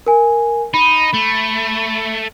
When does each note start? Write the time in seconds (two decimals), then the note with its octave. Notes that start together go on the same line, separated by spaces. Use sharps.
0.06 A#4 G#5
0.74 D#4 B5
1.14 A3